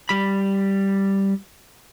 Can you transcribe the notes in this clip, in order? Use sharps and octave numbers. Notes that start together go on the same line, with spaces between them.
G3 B5